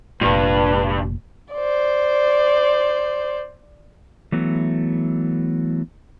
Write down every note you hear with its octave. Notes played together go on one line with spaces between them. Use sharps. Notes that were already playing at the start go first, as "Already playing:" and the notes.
F1 G2 A#2 B4
C5 D5
E3 F#3 A3 B3